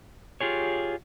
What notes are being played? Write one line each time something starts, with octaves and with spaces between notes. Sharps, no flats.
F4 G4 G#4 C#5